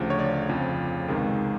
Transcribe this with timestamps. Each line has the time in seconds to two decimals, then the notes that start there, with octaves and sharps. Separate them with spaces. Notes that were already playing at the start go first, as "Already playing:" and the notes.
Already playing: D2 C#3 F3
0.10 C#5
0.19 D5
0.49 F2 C#3 F3
1.08 C#2 C3 D#3 G#3